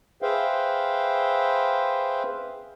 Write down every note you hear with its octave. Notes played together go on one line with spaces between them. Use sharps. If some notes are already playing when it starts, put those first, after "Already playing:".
G#4 B4 C5 E5 F5 G5